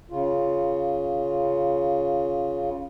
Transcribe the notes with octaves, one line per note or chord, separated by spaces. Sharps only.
C#3 F4